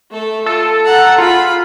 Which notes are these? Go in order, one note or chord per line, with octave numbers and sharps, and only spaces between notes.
A3 A4
F4 A4
F#5 A#5
F4 G#4 B5